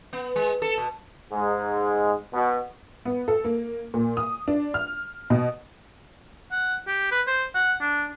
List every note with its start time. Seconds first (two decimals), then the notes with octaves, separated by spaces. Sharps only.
0.13 B3
0.36 G#3
0.62 A4
0.78 B2
1.32 G#2 G#3
2.33 B2
3.05 B3
3.28 A4
3.44 A#3
3.94 A#2
4.17 D#6
4.48 D4
4.74 F6
5.30 B2
6.52 F#5
6.87 G4
7.11 B4
7.27 C5
7.55 F#5
7.81 D4